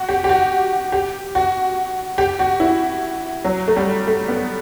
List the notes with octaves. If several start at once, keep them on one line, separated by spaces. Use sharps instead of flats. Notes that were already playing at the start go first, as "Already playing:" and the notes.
Already playing: F#4
G4
G4
F#4
G4
F#4
G4
F#4
E4
F#3
A3
G3
A3
B3